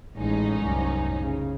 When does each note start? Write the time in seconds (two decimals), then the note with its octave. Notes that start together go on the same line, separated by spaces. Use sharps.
0.16 A1 A2 G#3 C#4 D#4
0.61 C2 F#2
1.21 C#3